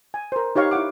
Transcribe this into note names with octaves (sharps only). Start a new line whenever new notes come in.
G#5
A#4 C5
D#4 G4 C#5 F5 C#6
E4 F5 F#5 D6